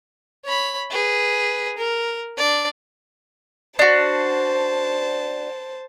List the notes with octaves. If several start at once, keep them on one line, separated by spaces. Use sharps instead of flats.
C#5 B5
G#4 B4
A#4
D4 D5
D4 F#4 C5 A5